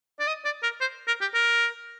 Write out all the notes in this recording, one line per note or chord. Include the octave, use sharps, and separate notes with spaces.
D5
D#5
D5
A#4
C5
A#4
G4
A#4